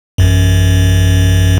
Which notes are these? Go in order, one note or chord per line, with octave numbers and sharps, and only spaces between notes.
A1 F#2